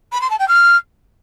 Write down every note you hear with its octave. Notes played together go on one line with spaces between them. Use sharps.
B5
C6
A5
G5
F6